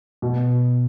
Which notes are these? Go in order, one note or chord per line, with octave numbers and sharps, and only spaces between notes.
B2